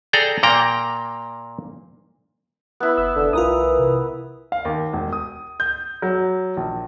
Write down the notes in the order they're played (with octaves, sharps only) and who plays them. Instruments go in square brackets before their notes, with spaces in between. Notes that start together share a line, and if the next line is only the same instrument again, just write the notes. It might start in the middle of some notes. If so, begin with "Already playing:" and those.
[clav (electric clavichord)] G#4 A4 D5 G5 A#5
A#2 A#3 G5 A#5
[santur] B3 E4
[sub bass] F#1 [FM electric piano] E6
[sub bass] F1 [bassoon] D3
[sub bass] B1 [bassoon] E3 [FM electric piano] F4 A#4 D#6
[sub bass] C3
[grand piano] F5
D#2
E1
D#6
G6
F#3
A#1